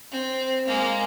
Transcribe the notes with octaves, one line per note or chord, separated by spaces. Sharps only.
C4
G#3 A#3